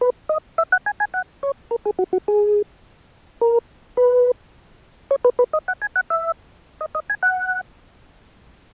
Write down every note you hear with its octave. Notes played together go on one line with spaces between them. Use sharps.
B4
D#5
E5
F#5
G#5
G#5
F#5
C#5
A#4
G#4
F#4
F#4
G#4
A#4
B4
C#5
B4
B4
D#5
F#5
G#5
F#5
E5
D#5
D#5
G#5
F#5